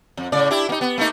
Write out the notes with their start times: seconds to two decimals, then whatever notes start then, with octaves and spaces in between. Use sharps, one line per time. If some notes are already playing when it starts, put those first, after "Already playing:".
0.17 F2
0.32 A2 C#3 D5
0.50 D4 E4 G4
0.69 A#3 D#4
0.81 B3
0.98 A3 A#3 D#4